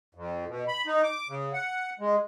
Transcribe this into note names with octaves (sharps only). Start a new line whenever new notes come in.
F2
B2
B5
D#4
D6
C#3
F#5
G#3